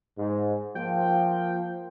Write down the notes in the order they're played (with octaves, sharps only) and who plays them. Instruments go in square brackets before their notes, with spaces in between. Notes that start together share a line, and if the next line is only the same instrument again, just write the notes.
[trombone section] G#2
[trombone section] F3 A#3 F4 [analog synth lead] G5